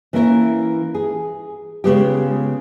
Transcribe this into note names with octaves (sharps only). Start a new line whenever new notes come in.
E3 A#3 C#4 E4 A#4
G#4
C#3 G#3 B3 F4 G4